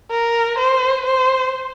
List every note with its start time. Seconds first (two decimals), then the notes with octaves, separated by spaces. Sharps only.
0.10 A#4
0.58 C5
1.05 C5